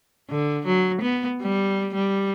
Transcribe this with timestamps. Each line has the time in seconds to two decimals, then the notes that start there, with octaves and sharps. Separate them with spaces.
0.30 D3
0.66 F#3
1.01 B3
1.42 G3
1.95 G3